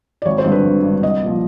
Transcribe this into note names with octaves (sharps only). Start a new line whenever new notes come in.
D5
G#1 C#5
C5
G2 D3
B4
G#1
G2 D3
C2 D#5
A#2 F3